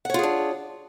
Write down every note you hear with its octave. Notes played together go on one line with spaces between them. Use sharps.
D4 F4 G#4 C#5 F#5